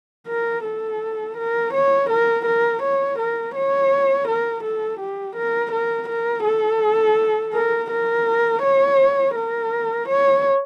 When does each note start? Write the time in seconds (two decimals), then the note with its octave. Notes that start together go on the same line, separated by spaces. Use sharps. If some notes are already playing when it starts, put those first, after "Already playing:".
0.27 A#4
0.64 A4
1.37 A#4
1.74 C#5
2.10 A#4
2.45 A#4
2.82 C#5
3.18 A#4
3.55 C#5
4.28 A#4
4.64 A4
5.00 G4
5.36 A#4
5.72 A#4
6.08 A#4
6.44 A4
7.53 A#4
7.91 A#4
8.62 C#5
9.35 A#4
10.08 C#5